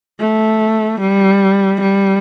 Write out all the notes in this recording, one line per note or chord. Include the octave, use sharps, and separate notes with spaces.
A3
G3
G3